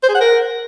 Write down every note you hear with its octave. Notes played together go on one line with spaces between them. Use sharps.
C5
G#4
F#5
A#4